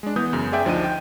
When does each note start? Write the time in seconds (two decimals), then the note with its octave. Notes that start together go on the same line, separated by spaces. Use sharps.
0.03 G#3 D4
0.16 E3 B3 D#6 G6
0.33 F#2 C#3
0.52 G#4 D5 E5 G5 G6
0.65 D2 F3 D4 D#4 D#7
0.84 G5